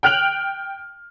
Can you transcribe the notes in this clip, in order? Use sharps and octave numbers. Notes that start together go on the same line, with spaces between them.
G5 F6 F#6 D7 F7 F#7